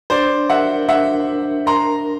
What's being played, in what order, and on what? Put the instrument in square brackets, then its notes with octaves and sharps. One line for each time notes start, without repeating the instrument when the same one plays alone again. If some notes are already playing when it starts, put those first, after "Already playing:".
[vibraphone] D4 [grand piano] C5 D5
[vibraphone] A#4 [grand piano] E5 F#5
[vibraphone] D4 [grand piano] E5 F#5
[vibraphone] D4
[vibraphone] A#4 [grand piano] A#5 C6